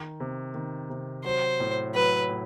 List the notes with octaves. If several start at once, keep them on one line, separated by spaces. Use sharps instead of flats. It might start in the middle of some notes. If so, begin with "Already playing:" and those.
Already playing: D#3
C3
D#3
C3
F#3 C5
A2
F#3 B4
A2